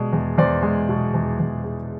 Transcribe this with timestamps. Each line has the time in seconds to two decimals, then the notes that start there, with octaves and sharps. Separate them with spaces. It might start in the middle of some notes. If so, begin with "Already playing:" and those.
Already playing: B2 G#3 D5
0.13 E2
0.38 E2 C5 D5
0.63 G#3
0.89 B2
1.14 E2
1.39 E2
1.64 G#3